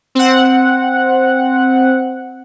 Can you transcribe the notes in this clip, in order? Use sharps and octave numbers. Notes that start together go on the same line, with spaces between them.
C4 F#5